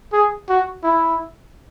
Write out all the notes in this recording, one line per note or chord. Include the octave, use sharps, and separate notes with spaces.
G#4
F#4
E4